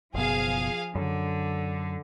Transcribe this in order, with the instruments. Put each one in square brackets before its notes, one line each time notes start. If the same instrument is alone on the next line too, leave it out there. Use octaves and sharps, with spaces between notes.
[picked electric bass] F#1 B2 [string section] F3 G#4 F5
[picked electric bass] F#2 [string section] D3